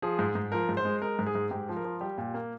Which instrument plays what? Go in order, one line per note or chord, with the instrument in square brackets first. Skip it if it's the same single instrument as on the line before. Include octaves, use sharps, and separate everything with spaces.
[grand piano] F3 G#4
G#2
G#2
F3 A#4
G#2
C5
G#3
G#3 A#4
G#2
G#4
G#2
G#2 G4
F3
A#4
F3
G3 G4
A#2
A#3